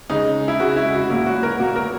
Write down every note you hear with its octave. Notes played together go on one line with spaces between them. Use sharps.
C#3 G#3 D#4
E4
C#3 G#3 F#4
E4
F#4
A#2 F#3 A#3 E4
F#4
A#4
A#2 F#3 A#3 F#4
A#4